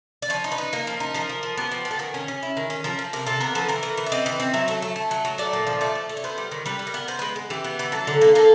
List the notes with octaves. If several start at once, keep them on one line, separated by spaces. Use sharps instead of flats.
D5
F3 C#5
D#4
B4
D#4
A#3 A#4
F3
D#4
F3 A#4
F3
F3
B3 G4
F3
B3
A4
D#3 G#4
C#4
C#4
E4
D#3
C#4
F3 A#4
F3
C3 A#4
C3 A4
B3 A#4
F3 A4
E3 A#4
E3
E3
E5
C4 D#5
E3
C4
F#3 E5
A3
A3
A3
F#3
F#3
A3 D5
A#2
F3
A3 D5
A3
A3
C#5
B3 C5
G3
D#3
G3 B4
G3
A#4
B3
B3 C5
G#3 B4
G#3
E3 G4
B3
E3
F#3 A4
D3
A#3
A#3 A4